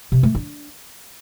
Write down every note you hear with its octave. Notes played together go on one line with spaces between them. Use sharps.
C3
A3
D4